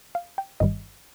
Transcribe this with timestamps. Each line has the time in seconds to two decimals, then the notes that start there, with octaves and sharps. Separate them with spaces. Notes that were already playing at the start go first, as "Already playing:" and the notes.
0.15 F5
0.38 G5
0.60 G1 G2 D#3 G3 D#5